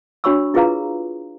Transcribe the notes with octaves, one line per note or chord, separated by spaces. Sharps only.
D4 F#4 C#5 B5 C#6 E6
E4 F4 G#4 B4 F5 A#5